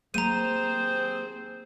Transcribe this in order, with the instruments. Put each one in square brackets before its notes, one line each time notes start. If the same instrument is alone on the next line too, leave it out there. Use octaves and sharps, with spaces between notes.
[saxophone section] D#2 C4 G#4 [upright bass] F#3 A#3 [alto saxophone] C5 [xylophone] A#5 D#7